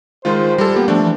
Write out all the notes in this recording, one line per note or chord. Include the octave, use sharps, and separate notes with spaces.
D#3 G#3 F4 C5
G3 A4
A#3 B3 G4
F3 A3 D4
E3